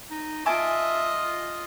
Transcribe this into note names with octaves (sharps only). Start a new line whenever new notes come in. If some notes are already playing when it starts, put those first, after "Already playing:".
D#4
F4 D#5 E5 G#5 A5 D6